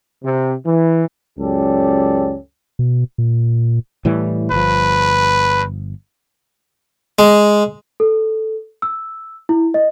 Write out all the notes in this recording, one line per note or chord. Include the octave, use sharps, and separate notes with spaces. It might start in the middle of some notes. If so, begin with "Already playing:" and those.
C3
E3
C#2 F#2 C#4 G4 A4 D5
B2
A#2
A2 E3 G3
G1 F3 B4
G#3
A4
E6
E4
D#5